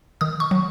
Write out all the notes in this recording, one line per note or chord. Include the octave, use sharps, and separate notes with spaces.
D#3 D#6
C#6
F#3